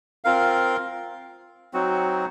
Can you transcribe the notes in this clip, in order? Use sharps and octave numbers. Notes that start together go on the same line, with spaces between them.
C4 F4 A#4 F5
F#3 C4 D#4 F#4